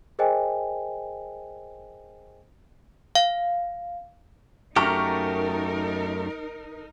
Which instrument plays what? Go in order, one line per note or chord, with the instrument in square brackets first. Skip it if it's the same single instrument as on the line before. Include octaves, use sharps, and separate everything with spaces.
[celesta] G#4 A#4 C5 D#5 G5 G#5
[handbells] F5
[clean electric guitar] F#2 A3 G4 [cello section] D#4 A#4 [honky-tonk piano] A#5 C#6 F6